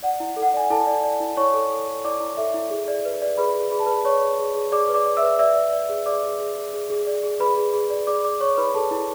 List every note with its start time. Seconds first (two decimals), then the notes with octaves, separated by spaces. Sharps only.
0.03 D5 F#5
0.20 E4
0.36 A4
0.43 F#5
0.54 D5 G#5
0.70 E4 A4 A5
0.87 D5
1.04 D5
1.20 E4
1.37 E4 C#5 C#6
1.54 A4
1.71 A4
1.88 A4
2.05 E4 D5 D6
2.20 E4
2.37 A4 E5
2.54 E4
2.71 G#4
2.88 D5
3.05 B4
3.22 D5
3.38 G#4 B4 B5
3.55 G#4
3.71 G#4 B5
3.79 A5
3.86 G#4 B4 B5
4.05 C#5 D5 C#6
4.22 G#4
4.39 G#4
4.55 G#4
4.72 G#4 D5 D6
4.89 B4
4.94 D5 D6
5.06 D5
5.17 E5 E6
5.22 B4
5.39 D5 E5 E6
5.56 D5
5.73 D5
5.89 G#4
6.06 G#4 D5 D6
6.23 G#4
6.40 G#4
6.56 G#4
6.74 G#4
6.90 G#4
7.07 D5
7.24 G#4
7.40 G#4 B4 B5
7.57 G#4
7.74 G#4
7.90 D5
8.07 G#4 D5 D6
8.24 D5 D6
8.41 C#5 D5 C#6
8.57 E4 B4 B5
8.74 G#4 A4 A5
8.91 E4